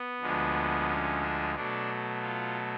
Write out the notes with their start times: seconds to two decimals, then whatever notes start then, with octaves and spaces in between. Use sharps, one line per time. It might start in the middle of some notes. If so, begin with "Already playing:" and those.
Already playing: B3
0.20 D2 D3 F3 G#3
0.88 C#4
1.21 D4
1.55 B2 F#3 A3 D4
2.22 F4